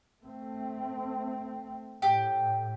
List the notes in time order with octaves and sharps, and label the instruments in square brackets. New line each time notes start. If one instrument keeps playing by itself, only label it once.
[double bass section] A3 C4
[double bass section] A2 [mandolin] G4